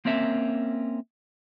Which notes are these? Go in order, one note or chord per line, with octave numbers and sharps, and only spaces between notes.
A#3 C4 C#4 A#4 E5